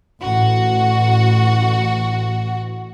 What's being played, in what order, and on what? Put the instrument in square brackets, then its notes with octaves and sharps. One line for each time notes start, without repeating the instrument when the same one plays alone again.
[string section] A1 F#4 F#5